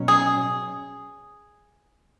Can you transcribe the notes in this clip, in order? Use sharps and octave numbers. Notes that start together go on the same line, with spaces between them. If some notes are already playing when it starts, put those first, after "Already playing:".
Already playing: B2 F#3 C#4 C#5
G#4